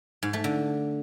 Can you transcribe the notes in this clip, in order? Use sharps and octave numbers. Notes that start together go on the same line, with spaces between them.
G#2
A3
D3